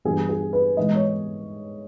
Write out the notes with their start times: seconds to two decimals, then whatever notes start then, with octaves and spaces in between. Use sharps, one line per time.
0.05 G2 E3 G3 B3 G#4
0.29 G#4
0.53 B4
0.77 G#2 E3 G#3 B3 D#5
0.95 C#5